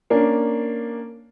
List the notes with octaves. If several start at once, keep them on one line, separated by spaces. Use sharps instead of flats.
A#3 C#4 D4